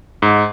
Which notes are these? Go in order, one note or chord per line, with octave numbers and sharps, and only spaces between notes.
G#2